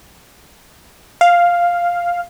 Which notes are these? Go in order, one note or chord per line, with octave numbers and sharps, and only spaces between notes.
F5